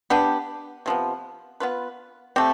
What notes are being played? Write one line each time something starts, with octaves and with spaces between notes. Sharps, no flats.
B3 D4 G4
C3 F3 B3
B3 F4 B4
A3 C4 G4